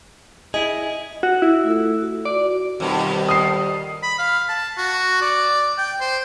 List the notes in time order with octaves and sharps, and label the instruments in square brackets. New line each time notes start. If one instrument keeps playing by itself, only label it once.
[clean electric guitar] E4 G#4 [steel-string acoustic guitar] D#5
[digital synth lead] F#4
E4
[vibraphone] A3 F4 A4
F#4
[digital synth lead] D5
[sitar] F2 B2 [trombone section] D#3 G3
[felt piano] D#6 C7
[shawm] B5
F5
A5
F#4
D5
G5
C5